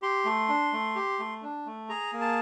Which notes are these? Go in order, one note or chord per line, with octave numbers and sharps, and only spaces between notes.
G4 C6
A3
D4
A3
G4
A3
D4
A3
G#4 A#5
A#3
A5